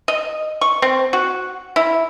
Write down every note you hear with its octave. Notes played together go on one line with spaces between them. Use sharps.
D#5
C#6
C4
F#4
E4